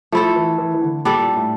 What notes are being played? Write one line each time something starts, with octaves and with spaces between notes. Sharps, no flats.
F3 A3 E4 A4
E3
E3
E3
D3
A#2 G3 D4 A4 D5
A2